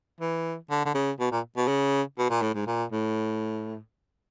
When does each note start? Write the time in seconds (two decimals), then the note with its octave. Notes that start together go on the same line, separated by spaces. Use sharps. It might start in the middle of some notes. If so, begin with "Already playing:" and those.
0.21 E3
0.70 D3
0.85 D3
0.94 C#3
1.19 B2
1.32 A#2
1.56 B2
1.68 C#3
2.18 B2
2.30 A#2
2.42 A2
2.54 G#2
2.67 A#2
2.92 A2